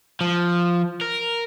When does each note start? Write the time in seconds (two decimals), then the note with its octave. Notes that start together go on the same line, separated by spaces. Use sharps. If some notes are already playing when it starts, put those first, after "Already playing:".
0.21 F3
1.01 A#4